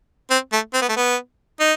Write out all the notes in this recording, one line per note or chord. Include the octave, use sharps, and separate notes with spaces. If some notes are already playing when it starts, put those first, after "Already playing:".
C4
A3
C4
B3
A3
B3
D#4